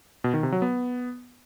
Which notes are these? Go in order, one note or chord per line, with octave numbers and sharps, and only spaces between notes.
B2
D#3
C3
F#3
B3